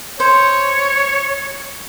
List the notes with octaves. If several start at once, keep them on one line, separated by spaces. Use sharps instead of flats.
C5 C#5